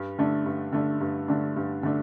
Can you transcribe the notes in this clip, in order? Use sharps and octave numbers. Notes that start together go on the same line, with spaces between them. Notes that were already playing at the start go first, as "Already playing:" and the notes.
Already playing: G2
D3 A3 D4
G2
D3 A3 D4
G2
D3 A3 D4
G2
D3 A3 D4